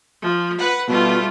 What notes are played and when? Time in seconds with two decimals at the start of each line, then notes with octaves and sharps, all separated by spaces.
0.21 F3
0.57 B4 F#5
0.88 B2 G3 A3 F4